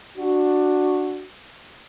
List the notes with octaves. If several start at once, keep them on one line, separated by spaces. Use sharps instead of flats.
D4 F#4